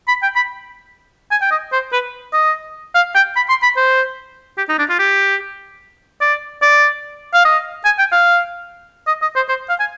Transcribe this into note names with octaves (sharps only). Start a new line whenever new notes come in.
B5
G5
B5
G#5
G5
D#5
C5
B4
D#5
F5
G5
B5
C6
B5
C5
G4
D#4
D4
F4
G4
D5
D5
F5
D#5
G#5
G5
F5
D#5
D#5
C5
C5
F5
G#5